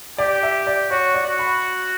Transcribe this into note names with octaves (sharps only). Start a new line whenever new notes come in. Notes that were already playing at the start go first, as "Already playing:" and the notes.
G4 D5
E5
D5
F#4 C#5
D5
F#4
B5